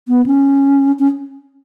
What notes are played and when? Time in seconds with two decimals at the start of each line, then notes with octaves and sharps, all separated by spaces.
0.08 B3
0.26 C#4
0.99 C#4